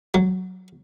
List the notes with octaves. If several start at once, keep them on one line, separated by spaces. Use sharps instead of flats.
F#3